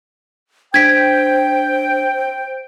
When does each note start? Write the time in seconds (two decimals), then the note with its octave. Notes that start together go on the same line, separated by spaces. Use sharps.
0.74 D4 C5 G5 G#6 B6 D7